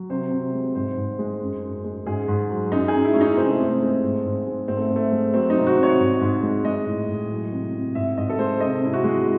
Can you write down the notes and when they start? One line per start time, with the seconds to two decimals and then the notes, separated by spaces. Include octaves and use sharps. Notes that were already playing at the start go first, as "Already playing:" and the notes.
Already playing: F#3
0.10 C3 C5
0.31 C3
0.53 G#3
0.75 G#2 C5
0.97 G#2
1.19 G#3
1.41 F#2
1.63 F#2
1.84 G#3
2.06 G#2 G#4
2.28 G#2
2.50 F#3
2.72 F#2 D#4
2.88 G#4
2.94 F#2
3.05 E4
3.14 G#3 C#4
3.21 D#4
3.37 C3 C4
3.50 A3
3.59 C3 C4
3.81 G#3
4.03 G#2
4.24 G#2
4.46 G#3
4.68 G#2 C4
4.77 A3
4.90 G#2
4.96 A3
5.12 G#3
5.34 F#3 C4
5.50 D#4
5.55 C3
5.67 F#4
5.77 C3
5.83 C#5
5.99 G#2
6.21 G#2
6.43 G#3
6.64 G#3 D#5
6.87 A2
7.08 A2
7.30 F#3
7.52 C3
7.74 C3
7.95 G#2 E5
8.17 G#2 D#5
8.29 A4
8.39 G#3 C5
8.60 C3 D#5
8.82 C3 E4
8.94 F#4
9.04 G#3